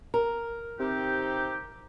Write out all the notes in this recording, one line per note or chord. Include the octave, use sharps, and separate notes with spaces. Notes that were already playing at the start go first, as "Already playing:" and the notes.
A#4
C3 C4 D#4 G4